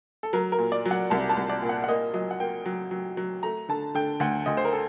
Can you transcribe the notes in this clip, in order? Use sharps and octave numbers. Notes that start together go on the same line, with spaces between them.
A4
F#3 A#4
A#4
A#2
D5
F#3
F#5
C2 A5
A5
C2
D5
A#2
F#5
F#5
A#3 D#5
F#3 D#5
F#5
A#3 G5
F#3
F#3
F#3
A3 A#5
D3 A5
D3 G5
D2 F#5
D2 D#5
C5
A#4
A4